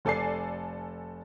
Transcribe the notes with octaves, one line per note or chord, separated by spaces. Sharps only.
F1 A4 D5 G#5 C7